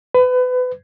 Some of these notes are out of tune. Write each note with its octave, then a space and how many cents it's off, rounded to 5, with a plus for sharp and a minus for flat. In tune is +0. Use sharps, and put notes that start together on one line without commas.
B4 +30